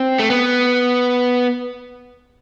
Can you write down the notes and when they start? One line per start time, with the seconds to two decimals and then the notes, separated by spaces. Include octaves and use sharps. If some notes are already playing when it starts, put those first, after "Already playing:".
Already playing: C4
0.20 A3
0.30 B3